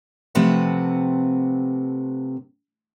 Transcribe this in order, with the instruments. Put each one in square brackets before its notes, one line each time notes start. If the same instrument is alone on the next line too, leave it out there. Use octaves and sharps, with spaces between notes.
[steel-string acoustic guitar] C3 F3 A3 C4 B4 F#5